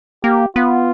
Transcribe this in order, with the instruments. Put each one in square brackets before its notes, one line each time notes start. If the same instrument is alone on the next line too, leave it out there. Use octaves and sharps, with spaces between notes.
[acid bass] A#3 [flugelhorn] G4
[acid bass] B3 [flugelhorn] F4